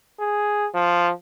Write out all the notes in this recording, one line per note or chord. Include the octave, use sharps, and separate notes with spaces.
G#4
F3